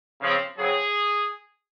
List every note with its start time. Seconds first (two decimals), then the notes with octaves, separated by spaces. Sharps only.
0.20 C#3 F3 C4
0.57 C#3 F#3 C4 G#4